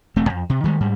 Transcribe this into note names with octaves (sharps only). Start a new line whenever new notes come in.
E1 A3 C4
F2
C3
D#3 E3 G3 G#3
G#2 G3